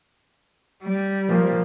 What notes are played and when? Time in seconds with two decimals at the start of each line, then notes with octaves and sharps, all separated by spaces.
0.84 G3
1.29 F3 A#3